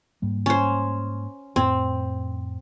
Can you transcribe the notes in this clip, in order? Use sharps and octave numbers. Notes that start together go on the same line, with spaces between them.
G#2 G3 A#3
C#4 C5
F2 A2 C4